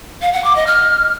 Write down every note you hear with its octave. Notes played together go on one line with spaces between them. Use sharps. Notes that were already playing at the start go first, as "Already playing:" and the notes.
F5
F#5
D6
D#5
F6